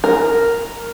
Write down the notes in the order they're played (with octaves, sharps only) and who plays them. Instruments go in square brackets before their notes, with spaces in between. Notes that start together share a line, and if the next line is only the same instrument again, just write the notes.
[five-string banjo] A#4